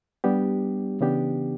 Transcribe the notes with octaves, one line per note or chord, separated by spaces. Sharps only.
G3 B3 D4 G4
C#3 E3 B3 D4 G4